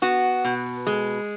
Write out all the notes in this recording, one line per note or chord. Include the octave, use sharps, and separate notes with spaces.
B3 F#4
B2
G#3